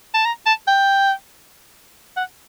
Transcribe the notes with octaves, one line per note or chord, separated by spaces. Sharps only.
A5
A#5
A5
G5
F#5